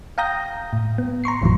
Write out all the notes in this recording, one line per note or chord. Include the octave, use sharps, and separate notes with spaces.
F5 G5 A#5 D#6 G6 A#6
A2
B3
A#5 C6 C#6 C7
G#1 F2 A2 D#3 E3 F#3